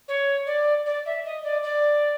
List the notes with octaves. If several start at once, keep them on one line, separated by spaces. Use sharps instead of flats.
C#5
D5
D5
E5
D#5
D5
D5